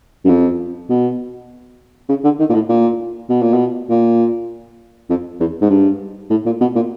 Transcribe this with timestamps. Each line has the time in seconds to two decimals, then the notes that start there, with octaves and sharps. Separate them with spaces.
0.25 F#2
0.29 F2
0.89 B2
2.09 C#3
2.24 D3
2.39 D#3
2.50 A#2
2.54 A2
2.69 A#2
3.29 B2
3.42 A#2
3.54 B2
3.90 A#2
5.10 F2
5.40 E2
5.61 G#2
5.70 G2
6.30 A2
6.45 A#2
6.61 B2
6.75 A#2